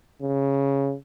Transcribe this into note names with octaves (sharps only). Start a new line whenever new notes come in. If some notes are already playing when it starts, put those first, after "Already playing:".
C#3